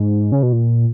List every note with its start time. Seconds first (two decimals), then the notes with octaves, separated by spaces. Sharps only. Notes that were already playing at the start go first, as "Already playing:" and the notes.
Already playing: G#2
0.32 C#3
0.43 B2
0.53 A#2